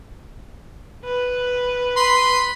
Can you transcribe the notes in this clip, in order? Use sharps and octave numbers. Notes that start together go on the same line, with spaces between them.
B4
B5 C6